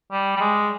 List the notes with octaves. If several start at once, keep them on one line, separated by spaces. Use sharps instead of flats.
G3
G3
G#3